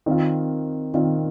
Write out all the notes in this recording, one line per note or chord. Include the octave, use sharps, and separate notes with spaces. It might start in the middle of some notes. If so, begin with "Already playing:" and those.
D#3 C4 F4
D#3 C4 F4